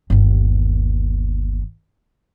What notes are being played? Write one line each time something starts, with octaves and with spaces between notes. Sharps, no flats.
G1 D#2